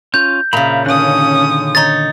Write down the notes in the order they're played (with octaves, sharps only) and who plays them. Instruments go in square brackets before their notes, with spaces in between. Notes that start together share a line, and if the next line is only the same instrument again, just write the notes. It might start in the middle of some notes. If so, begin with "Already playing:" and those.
[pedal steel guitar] C#4 F4 [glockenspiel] G6
[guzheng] A#2 C#3 [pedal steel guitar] E5 A#5 B5
[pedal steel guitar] D3 D#3 F#6 [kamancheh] C#4 D#6
[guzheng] D#4 C#5 [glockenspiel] A6